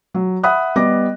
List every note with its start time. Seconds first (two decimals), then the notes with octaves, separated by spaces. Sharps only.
0.14 F#3
0.43 E5 F#5 B5 D#6 F#6
0.76 G3 B3 D#5 D6 A#6